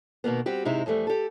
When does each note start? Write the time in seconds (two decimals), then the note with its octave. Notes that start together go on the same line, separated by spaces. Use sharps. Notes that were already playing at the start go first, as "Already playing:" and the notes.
0.24 B2 D#3 A#3 B3
0.46 G3 C4 F#4 G4
0.65 G#2 C3 G#3 D#4 E4
0.86 F2 E3 G3 A3
1.07 G4 A4